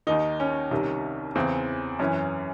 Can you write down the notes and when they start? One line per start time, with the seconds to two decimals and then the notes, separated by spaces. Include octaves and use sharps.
0.07 D#2 D#3 D#4
0.40 C#4
0.71 C2 C3 D#3
1.35 E2 C#3 E3 C4
1.99 F#2 E3 C#4